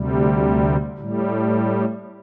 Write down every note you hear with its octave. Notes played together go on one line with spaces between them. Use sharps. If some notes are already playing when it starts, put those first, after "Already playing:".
Already playing: D2 C3 G3
A2 G3